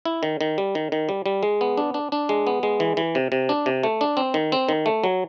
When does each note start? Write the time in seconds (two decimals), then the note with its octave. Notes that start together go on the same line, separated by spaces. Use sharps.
0.05 E4
0.23 D#3
0.41 D#3
0.58 G3
0.75 D#3
0.92 D#3
1.09 G3
1.26 G3
1.43 G#3
1.61 B3
1.78 D4
1.94 D4
2.12 D4
2.29 G#3
2.47 B3
2.63 G#3
2.80 E3
2.97 E3
3.15 C3
3.32 C3
3.49 D4
3.66 C3
3.83 A3
4.01 D4
4.17 C4
4.34 D#3
4.52 C4
4.69 D#3
4.86 A3
5.04 F#3